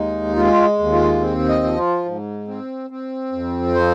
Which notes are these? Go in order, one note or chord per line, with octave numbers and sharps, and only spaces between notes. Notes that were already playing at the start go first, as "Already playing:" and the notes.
Already playing: D#2 G#3 D#4
G#3 F4
D#2
F4
C4
D#5
F3
F4
G#2
C4
C4
F2
F3 C5